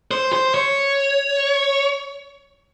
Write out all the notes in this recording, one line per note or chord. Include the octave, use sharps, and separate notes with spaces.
C5
C5
C#5